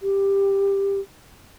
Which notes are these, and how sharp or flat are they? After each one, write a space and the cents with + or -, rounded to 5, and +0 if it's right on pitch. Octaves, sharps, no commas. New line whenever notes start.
G4 +10